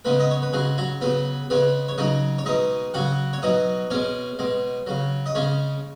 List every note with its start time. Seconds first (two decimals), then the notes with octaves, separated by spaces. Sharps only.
0.05 C#3 G#3 B3 B4
0.20 D#5
0.31 C#5
0.42 B4
0.53 C#3 F#3 G#3 G#4
0.78 F#3 F#4
1.01 C#3 F#3 B3 B4
1.50 C#3 G#3 B3 B4
1.88 C#5
1.98 C#3 F#3 D#4 D#5
2.38 C#5
2.46 B2 G#3 D#4 D#5
2.94 C#3 F#3 F#4 F#5
3.33 C#5
3.42 B2 F#3 D#4 D#5
3.90 B2 G#3 C#4 C#5
4.39 B2 G#3
4.87 C#3 F#3
5.26 D#5
5.35 C#3 G#3 C#4 C#5